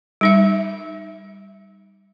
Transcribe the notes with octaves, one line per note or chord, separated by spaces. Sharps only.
G3 D#4 E5